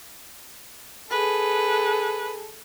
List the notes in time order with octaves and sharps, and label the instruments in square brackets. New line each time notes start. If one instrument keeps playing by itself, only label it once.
[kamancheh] G#4 A4 [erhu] B4